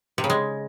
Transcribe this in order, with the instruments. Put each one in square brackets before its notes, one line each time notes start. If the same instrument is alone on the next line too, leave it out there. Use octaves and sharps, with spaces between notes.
[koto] C3
C#3
G#3